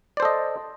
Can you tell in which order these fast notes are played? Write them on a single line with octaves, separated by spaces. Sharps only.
D5 C5 A4 D#5